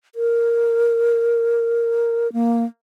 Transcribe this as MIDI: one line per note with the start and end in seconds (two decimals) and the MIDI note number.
0.15 2.31 70
2.33 2.64 58